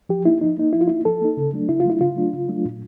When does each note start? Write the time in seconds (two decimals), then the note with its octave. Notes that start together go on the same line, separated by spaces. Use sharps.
0.09 F3 G4
0.25 A#3 D#4 E4
0.41 F3 D#4
0.57 A#3 D#4
0.73 F3 E4
0.81 F4
0.88 A#3 D#4 E4
1.05 F3 A4
1.21 A#3 D#4
1.37 C#3
1.53 F#3 A3 D4
1.69 C#3 E4
1.80 F4
1.85 F#3 A3 D4 E4
2.01 C#3 F4
2.16 F#3 A3 D4
2.33 C#3
2.49 F#3 A3 D4
2.65 A#2